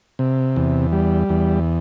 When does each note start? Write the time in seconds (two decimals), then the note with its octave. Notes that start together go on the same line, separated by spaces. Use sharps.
0.19 C3
0.56 E2
0.92 G3
1.29 E2